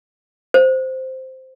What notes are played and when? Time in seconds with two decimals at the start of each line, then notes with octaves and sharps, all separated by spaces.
0.54 C5